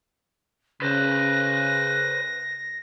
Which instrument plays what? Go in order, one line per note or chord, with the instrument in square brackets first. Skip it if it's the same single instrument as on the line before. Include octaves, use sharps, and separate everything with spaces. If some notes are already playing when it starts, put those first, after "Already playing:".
[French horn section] C#3 [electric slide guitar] B4 C5 [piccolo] A#6